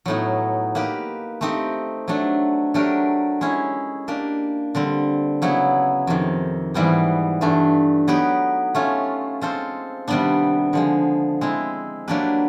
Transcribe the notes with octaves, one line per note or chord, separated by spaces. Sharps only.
A2 F#3 B3 D#4
A#3 D#4 G4 B4
A3 C4 D#4 G4
F#3 A3 D4
F#3 A3 D4 G4 A#4
G#3 C#4 E4
A#3 D4 G4
D3 G3 C4
C#3 F#3 B3 E4
F2 C3 D#3
G#2 E3 G3 B3 D#4
G2 E3 A3 D4
F#3 B3 D#4 G4 B4
A3 C#4 F4
G#3 C4 F4 A4 C5
C3 D#3 G3 B3 D4
D3 F3 G#3
G#3 C4 E4
F#3 A#3 D4 G4 B4